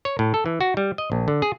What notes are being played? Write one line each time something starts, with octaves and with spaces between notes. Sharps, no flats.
C#5
A2
A4
E3
F#4
G3
D#5
A#1
D3
G#4